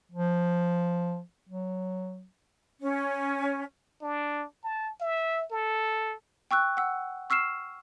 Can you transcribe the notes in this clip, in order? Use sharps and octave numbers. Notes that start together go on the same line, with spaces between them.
F3
F#3
C#4
D4
A5
E5
A4
G5 C#6 E6 F#6
F#5 E6
C#6 E6 F6 C7 E7